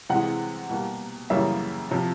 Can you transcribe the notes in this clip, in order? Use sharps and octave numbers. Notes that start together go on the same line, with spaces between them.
C3 E3 G#3 F#5
B2 G3 A#3
F#2 C#3 E3 G3 A#3 E5
C3 F3